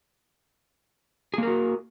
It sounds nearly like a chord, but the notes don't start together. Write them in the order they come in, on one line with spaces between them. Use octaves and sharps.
G#4 A#3 A#4 F#4